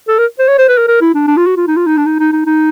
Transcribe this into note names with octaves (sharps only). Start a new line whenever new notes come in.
A4
A#4
C5
C#5
C5
B4
A#4
A#4
E4
D4
D4
F4
F#4
F4
D#4
F4
D#4
D4
D#4
D#4
D#4
D#4